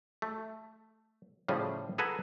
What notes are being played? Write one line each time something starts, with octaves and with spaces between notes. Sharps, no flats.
A3
A2 C#3 F3 G3 G#4
G#4 A4 B4 F#5 G#5 A#5